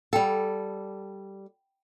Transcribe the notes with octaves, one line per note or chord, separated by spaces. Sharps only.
G3 A4 F#5 G5 B5